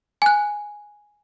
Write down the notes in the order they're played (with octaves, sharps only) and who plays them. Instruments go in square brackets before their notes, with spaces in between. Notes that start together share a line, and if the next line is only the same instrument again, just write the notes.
[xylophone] G#5 F#6